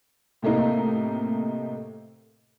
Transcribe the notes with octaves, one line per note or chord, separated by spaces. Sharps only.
A2 C3 A3 A#3 D#4